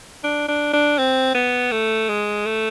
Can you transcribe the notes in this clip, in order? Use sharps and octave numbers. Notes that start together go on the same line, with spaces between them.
D4
D4
D4
C4
B3
A3
G#3
A3